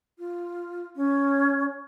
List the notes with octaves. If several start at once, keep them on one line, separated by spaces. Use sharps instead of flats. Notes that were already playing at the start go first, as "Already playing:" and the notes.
F4
C#4